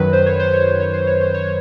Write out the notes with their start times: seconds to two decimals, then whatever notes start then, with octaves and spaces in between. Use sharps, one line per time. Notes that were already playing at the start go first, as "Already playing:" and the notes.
Already playing: F#2 D#3 F#3 B4
0.13 C5
0.26 C#5
0.40 C5
0.53 C#5
0.67 C5
0.80 C#5
0.94 C5
1.07 C#5
1.21 C5
1.34 C#5